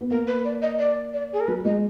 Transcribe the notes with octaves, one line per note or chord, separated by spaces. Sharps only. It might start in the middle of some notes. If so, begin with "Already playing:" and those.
B3
A#3 A#4
B4
D5
D#5
D5
D5
G#4
A#4
F#3 B4
G#3 D#5